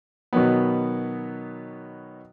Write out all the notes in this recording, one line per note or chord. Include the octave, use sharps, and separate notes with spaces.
B2 D#3 F#3 B3